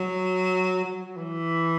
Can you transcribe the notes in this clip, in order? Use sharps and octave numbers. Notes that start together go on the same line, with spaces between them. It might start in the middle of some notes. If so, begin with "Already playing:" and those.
Already playing: F#3
F#3
E3